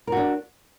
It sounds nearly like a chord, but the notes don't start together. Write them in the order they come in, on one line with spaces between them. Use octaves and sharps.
A#4 F#4 D4